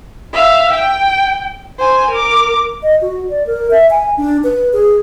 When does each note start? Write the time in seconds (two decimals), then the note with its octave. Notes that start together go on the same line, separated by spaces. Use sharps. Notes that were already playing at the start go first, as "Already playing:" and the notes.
0.33 E5 F5
0.74 G5
1.80 C5 G#5
2.11 A#4 D6
2.83 D#5
3.01 F#4
3.29 D5
3.47 A#4
3.71 E5
3.91 G#5
4.17 D4
4.44 B4
4.73 G#4